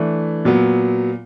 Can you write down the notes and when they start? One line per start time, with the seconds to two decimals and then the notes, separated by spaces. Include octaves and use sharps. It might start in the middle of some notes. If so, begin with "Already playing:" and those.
Already playing: E3 A3 D4
0.45 A#2 F#3 B3